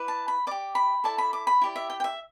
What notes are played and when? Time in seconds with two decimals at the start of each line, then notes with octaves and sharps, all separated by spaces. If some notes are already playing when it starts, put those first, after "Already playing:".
Already playing: E4 B4 D5
0.08 A5
0.28 B5
0.47 G4 D5 D6
0.75 B5
1.04 E4 A4 D5 A5
1.18 B5
1.33 D6
1.47 B5
1.61 E4 G4 D5
1.76 E5
1.90 G5
2.00 G5
2.04 E5